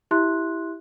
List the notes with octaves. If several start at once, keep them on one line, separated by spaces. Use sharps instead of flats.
E4 G4 E5 C6 F#6